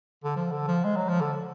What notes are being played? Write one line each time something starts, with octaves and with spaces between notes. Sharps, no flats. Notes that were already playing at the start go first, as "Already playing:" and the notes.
D3
F3
D3
F3
G#3
F#3
F3
D3